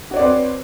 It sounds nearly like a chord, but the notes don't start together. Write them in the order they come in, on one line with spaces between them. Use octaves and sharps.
F#4 C#5 D5 C4 B4